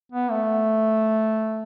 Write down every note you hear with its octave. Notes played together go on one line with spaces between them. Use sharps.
B3
A3